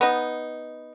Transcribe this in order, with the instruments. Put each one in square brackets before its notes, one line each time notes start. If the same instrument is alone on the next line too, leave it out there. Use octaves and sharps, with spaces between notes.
[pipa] B3 D#4